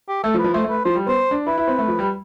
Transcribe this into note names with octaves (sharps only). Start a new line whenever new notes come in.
G4
A3 A4
F3
B4
F3
A3 C5
A3
B4
F3 C5
G3
B3 C5
D4
E4 B4
E4
C4
A3
F3
G3